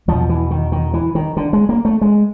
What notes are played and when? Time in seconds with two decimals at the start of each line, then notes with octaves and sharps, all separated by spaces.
0.08 E2 B2 F3
0.29 E3
0.51 D#3
0.72 D#3
0.94 E3
1.15 D#3
1.37 D3
1.53 G#3
1.69 A#3
1.85 A3
2.01 G#3